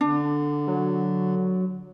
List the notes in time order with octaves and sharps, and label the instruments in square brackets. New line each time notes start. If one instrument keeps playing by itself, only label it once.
[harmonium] D3 [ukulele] D4
[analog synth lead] F#3